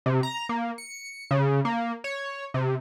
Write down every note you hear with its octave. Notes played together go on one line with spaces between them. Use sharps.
C3
A#5
A#3
C#7
C#3
A#3
C#5
C3